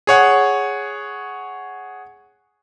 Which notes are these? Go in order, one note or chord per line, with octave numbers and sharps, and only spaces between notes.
G#4 C#5 F#5